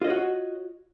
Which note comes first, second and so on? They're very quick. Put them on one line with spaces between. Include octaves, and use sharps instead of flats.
F4 D#5 C#5 F#4